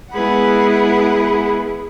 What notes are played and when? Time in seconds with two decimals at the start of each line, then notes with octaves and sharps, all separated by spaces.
0.12 G#3 B3 E4 G#4 B4 F#5